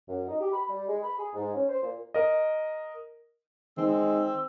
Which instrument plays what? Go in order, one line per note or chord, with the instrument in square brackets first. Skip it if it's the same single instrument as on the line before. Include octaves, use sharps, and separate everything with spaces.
[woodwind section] F#2
D#4
G4
B5
G3
G#3
B5
G#4
G#2
C#4
C5
A#2
[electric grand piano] A#4 D#5
[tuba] D#3 [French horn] G#3 [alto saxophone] C4 [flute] E6